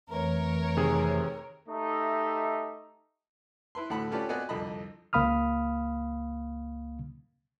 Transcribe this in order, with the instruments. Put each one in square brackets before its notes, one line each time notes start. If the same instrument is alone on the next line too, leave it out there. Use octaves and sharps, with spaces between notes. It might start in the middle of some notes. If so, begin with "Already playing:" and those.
[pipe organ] F2 E3 A3 [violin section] A#4 C#5
[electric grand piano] C3 D#3 G#4
[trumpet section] A3 D#4 G4 D#5 E5
[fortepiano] E4 B4 C6
D2 A2 F#5 B5
C#4 F4 G4 A4 B4 D5
B3 C4 F#4 D5 D#5 G#5
C2 F2 D3 D#5 B5
[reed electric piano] C#2 A#3 F5 B5 D#6 F6